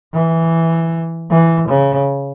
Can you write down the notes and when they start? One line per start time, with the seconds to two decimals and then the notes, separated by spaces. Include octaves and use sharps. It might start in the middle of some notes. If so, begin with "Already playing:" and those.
0.13 E3
1.30 E3
1.69 C#3